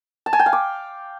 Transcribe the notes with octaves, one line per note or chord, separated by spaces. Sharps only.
A5
G#5
G5
F5
D6